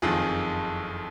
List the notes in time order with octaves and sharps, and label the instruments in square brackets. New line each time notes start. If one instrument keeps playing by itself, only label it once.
[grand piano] F#1 F2 D#3 F4 G#4